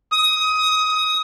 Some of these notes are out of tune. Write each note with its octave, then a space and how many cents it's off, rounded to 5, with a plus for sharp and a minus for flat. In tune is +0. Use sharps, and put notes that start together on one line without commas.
D#6 +20